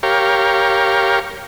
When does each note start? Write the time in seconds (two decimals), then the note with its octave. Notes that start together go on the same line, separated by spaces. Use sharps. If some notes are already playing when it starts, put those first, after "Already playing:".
0.03 G4 A#4 C#5 F5